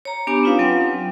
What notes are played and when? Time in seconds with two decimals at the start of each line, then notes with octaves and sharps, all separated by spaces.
0.05 C#5 A#5
0.27 B3 D4 G4 G#5 D6
0.43 C#4 D#4 F4 B4 F5
0.59 F#3 C4 G5